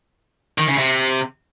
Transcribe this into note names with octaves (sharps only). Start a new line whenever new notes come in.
D#3
C#3
C3